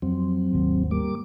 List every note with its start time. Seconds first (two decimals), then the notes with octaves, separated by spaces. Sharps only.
0.02 F2 F#3 C4
0.53 G#1 D#2
0.91 G3 A#3 D6